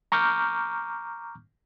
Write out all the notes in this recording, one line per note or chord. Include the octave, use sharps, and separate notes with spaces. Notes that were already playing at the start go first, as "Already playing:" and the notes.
A#5 C#6 D6 F6 G6